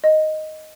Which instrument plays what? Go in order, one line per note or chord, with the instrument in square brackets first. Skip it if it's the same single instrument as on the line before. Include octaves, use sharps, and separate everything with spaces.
[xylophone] D#5